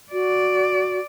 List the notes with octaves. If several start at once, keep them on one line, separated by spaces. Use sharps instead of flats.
F#4 D5